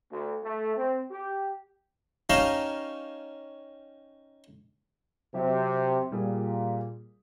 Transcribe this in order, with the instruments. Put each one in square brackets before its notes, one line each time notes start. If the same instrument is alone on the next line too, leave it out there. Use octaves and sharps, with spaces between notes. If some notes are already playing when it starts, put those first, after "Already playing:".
[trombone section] D2
A3
C4
G4
[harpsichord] C#4 D#4 G4 F5 A5 A#5
[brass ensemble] C3 [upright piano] F#3 G4 E5
[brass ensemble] A#2 [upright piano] G3 G#4